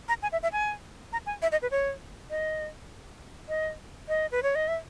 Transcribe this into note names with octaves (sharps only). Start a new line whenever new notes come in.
A#5
G#5
E5
E5
G#5
A#5
G#5
E5
D#5
B4
C#5
D#5
D#5
D#5
B4
C#5
D#5
E5